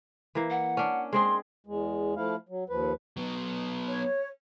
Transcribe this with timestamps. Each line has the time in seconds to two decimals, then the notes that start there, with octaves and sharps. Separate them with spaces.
0.35 E3 A#3
0.50 F#5
0.77 C#4 D4
1.13 G#3 C4 G#4 C6
1.67 E2 G#3
2.16 F3 A3 E4 F5
2.49 F#3
2.70 D#2 F3 B4
3.17 F#3 B3
3.88 C#5